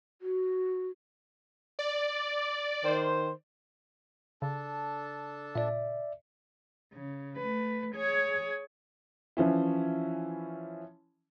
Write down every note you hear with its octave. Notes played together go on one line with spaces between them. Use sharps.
F#4
D5
D#3 C5
C#3 D4 A4 A5
A#2 D5 E5
C#3
A3 B4
G#4 C#5
E3 F3 C#4 E4